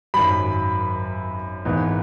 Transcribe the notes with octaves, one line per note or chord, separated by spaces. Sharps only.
G#1 F#2 D#3 F#3 B5
G#1 G#2 E3 B3 D#4